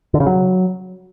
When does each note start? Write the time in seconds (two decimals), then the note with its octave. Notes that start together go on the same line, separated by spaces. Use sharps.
0.14 D3
0.20 C#3
0.27 F#3